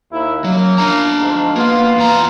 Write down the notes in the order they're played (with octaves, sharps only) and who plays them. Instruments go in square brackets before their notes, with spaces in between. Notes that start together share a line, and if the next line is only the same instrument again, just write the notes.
[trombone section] D#2 D#4 E4
[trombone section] F#2 A#3 [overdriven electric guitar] F#3
[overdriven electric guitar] D4 A#5
[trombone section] D2 G#2 F3
[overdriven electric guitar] A#3 [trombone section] B3 F4
[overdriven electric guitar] E2 A#5